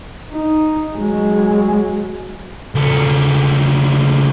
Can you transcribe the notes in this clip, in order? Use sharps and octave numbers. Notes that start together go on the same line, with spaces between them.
D#4
F#3 G#3
C#2 A3